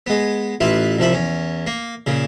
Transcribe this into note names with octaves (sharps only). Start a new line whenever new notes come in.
G#3 B3
A1 E4 F4 B4
C2 F3 E5 B5
E2 C#4
A#3
A#2 C#3